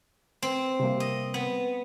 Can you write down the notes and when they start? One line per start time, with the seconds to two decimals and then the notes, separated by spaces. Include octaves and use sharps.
0.42 C4
0.80 C3 G3 A#3
1.00 D#5
1.34 B3